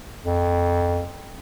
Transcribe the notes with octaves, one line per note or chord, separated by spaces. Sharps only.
F2